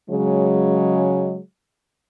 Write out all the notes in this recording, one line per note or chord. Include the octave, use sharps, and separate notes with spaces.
C#3 F#3 G#3